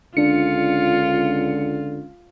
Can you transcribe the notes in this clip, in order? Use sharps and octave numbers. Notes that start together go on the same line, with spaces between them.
C#2 D3 D4 F4 C#7